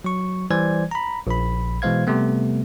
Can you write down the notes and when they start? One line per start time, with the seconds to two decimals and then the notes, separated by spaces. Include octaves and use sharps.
0.04 F#3 C#6
0.50 E3 G3 C5 D5 G#5 G#6
0.91 A#5 B5
1.27 A#1 B5
1.82 B2 E3 G#3 C5 F5 G#6
2.07 C3 G3 A3 B3